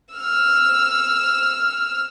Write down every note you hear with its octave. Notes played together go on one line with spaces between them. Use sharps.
E6 F6